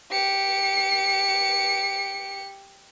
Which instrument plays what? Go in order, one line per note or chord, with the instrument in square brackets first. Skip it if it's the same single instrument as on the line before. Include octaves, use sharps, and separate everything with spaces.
[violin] G4 C#7